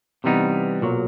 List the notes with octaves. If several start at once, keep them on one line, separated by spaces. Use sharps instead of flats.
C3 E3 G3 B3 D#4
B1 A#2 F#3